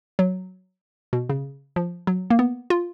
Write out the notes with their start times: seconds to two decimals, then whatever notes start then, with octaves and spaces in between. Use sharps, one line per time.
0.19 F#3
1.13 B2
1.29 C#3
1.76 F3
2.07 F#3
2.30 A#3
2.39 B3
2.70 F4